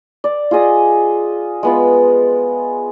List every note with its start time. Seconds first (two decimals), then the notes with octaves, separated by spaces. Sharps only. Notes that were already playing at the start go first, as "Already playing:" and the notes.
0.24 D5
0.51 F4 G#4 D#5 D#6
1.63 G#3 B3 F4